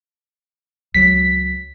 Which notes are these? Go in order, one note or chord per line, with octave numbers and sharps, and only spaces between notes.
C#2 F#3 B6